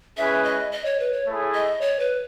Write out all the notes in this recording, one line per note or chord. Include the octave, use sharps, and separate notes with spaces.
G#3 C#4 E4 G#4 B4 E5
D#5
D#5
C#5
B4
C#5
A3 E4 G#4
D#5
C#5
B4